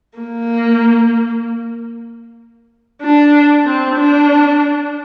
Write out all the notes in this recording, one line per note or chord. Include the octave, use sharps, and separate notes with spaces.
A#3
D4
C4
D4